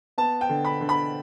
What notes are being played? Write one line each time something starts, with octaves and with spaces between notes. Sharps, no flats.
B3 A5
G5
D3
B5
D3
B5